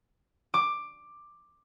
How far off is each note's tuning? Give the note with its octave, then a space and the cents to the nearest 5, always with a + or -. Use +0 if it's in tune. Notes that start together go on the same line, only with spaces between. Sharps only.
D6 +10